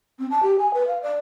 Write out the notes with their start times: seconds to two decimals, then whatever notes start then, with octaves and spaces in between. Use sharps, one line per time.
0.19 C4
0.31 A5
0.43 G4
0.59 G#5
0.74 B4
0.87 F5
1.02 D5